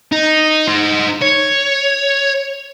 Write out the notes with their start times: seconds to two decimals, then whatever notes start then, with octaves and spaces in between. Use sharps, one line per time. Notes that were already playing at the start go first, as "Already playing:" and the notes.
0.12 D#4
0.67 D#4 C5
1.22 C#5